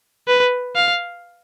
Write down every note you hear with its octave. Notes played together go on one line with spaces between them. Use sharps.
B4
F5